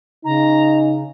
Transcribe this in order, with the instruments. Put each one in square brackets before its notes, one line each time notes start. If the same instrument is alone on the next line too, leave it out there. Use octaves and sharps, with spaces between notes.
[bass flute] C#3 [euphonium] D#4 [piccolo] A#5